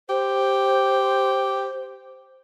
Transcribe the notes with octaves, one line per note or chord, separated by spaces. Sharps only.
G4 C5